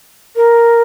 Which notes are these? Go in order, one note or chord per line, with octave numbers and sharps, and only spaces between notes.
A#4